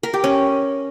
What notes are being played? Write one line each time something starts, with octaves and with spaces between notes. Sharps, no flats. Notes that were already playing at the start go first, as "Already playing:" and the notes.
A#4
G4
C#4